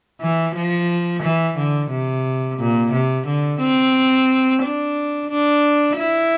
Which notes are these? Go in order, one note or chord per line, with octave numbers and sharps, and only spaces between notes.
E3
F3
E3
D3
C3
A#2
C3
D3
C4
D4
D4
E4